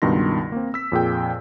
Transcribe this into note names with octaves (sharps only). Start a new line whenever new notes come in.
C#2 G2 B2 D#3 C6 A#6
A#3 C4
E6 B6
F2 A#2 G#4 G5